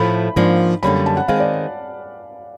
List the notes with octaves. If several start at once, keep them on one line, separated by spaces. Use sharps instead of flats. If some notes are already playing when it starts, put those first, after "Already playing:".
Already playing: A2 F3 A3 B5
G#2 F3 A#3 D4
F#2 D3 G3 A#3 C#4 B5
A5
F#5
D#3 G#3 C4 F5
D5